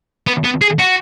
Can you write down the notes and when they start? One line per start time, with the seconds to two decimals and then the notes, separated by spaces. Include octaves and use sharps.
0.27 B3
0.44 B3
0.61 G#4
0.79 F#4